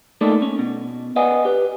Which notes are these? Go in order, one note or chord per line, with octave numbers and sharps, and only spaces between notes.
A3 A#3 D#4 A4 D5
C#4
B2
B4 D5 D#5 F#5 G#5
G4 B4